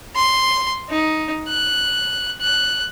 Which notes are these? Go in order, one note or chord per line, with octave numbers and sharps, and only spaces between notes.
C6
D#4
F#6
F#6